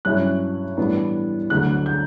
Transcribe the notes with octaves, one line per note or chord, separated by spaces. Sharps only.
G2 F#3 C#4 E4 F#6
A2 E3 G3 B3 D4
D2 D3 F#3 F#6
G6